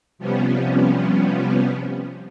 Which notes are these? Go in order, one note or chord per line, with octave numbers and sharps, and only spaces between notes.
C3 F3 G3 B3 C#4